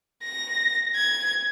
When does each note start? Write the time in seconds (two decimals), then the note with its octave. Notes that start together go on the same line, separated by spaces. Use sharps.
0.23 A#6
0.95 G#6